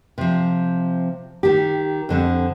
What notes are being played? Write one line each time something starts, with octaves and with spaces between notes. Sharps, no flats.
C3 F3
D#3 G4
F2 D3 C4